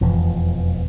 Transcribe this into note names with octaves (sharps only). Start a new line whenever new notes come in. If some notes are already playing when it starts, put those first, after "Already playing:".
E1 F2 E3 F3